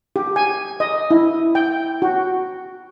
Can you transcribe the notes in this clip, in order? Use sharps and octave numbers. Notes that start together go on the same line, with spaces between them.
G4
G#5
D#5
E4
G5
F#4